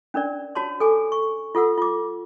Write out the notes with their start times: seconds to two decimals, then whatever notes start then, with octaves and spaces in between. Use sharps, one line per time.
0.14 C#4 D4 A#4 D5
0.55 F#4 C#5 A5 C6
0.80 A4 G#5 D6
1.12 C#6
1.55 F4 A4 F#5 E6
1.78 F4 D6